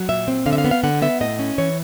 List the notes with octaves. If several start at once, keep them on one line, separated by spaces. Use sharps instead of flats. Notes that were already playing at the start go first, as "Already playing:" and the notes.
Already playing: F#3
A#2 E5
C4
D3 F5
E5
F5
B3
F5
D3 F#5
B3 E5
A2 D#5
C#4
E3 C#5